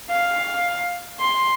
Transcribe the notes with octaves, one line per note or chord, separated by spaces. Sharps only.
F5
C6